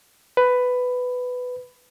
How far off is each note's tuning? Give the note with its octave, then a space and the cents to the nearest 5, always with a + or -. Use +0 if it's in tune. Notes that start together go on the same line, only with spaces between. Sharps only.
B4 +10